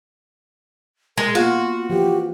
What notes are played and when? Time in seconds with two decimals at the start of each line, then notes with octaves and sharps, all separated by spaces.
1.18 G#3 A#4
1.35 A#3 B3 F4 F#4 F5
1.90 E3 F3 G4